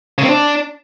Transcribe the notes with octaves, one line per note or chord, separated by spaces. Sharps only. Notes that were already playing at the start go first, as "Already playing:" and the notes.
C#3
C4
D4